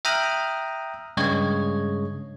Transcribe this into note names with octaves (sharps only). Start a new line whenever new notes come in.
E5 G5 A#5 D#6 F6 F#6
G2 C#3 G#3 C#5 D#5 G#6